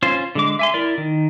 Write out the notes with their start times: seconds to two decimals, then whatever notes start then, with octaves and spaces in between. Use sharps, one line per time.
0.03 C#4 F4 C5
0.35 D3 G#3 D6
0.59 E5 G#5 C6
0.74 E4 A#4 D5
0.98 D#3